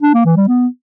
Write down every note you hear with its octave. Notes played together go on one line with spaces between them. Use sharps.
D4
A#3
E3
G3
B3